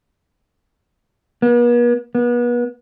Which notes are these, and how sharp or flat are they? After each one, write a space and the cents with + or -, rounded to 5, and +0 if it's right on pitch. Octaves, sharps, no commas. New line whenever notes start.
B3 -45
B3 -35